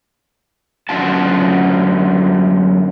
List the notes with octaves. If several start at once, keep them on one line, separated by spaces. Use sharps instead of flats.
F#2 D3 D4 F4 F#4 A5